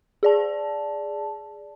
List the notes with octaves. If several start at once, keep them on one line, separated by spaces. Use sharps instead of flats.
G#4 D5 A5